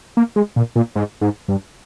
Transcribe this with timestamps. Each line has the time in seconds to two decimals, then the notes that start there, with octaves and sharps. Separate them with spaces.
0.17 A#3
0.36 G#3
0.56 A#2
0.76 A#2
0.95 G#2
1.21 G#2
1.48 G2